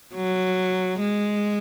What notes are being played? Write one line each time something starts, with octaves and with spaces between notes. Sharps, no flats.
F#3
G#3